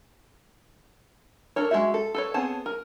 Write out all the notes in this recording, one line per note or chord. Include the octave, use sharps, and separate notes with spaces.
D4 A4 A#4 C#5
G#3 E4 F#4 E5
A4
A4 B4 C#5
B3 C4 G#4 C#5 A5
A#4